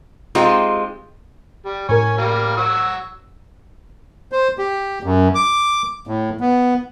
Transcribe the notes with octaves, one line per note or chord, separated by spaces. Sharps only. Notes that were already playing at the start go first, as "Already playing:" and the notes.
G#3 C4 D#4 F4 G4
G3
A2 A#4 C#5 G#5
G3 A#3 F6
F#3 F#4 E6
C5
G4
F#2
D6
A2
B3